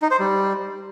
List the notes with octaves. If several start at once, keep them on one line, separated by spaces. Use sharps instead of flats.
D#4
C5
G3